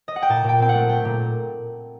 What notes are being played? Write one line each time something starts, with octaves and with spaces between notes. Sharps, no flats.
D#5
F#5
G5
A#2 A5
A#2 G5
C4 G5
F#5
A3
A3 G5
A#2